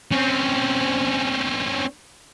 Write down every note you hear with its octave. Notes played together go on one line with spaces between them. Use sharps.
C4 C#4